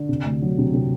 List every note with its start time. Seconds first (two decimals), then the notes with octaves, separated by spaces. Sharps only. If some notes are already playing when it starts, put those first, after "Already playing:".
Already playing: D3
0.09 C3
0.25 D2
0.42 F#3
0.58 C3
0.74 C3